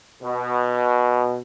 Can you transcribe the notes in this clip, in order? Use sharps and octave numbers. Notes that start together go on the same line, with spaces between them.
B2